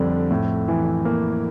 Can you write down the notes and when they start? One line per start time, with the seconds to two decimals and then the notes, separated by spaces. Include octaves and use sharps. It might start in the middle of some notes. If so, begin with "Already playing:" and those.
Already playing: F2 D3 G3 D4
0.31 A2
0.68 E3
1.05 A#3